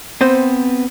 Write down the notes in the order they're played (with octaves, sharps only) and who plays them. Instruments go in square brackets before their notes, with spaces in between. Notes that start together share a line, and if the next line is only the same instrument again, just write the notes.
[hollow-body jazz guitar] B3 C4 C5